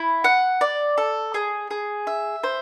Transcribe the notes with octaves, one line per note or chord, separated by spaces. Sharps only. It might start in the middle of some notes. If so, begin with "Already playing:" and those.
Already playing: E4
F#5
D5
A4
G#4
G#4
E5
C5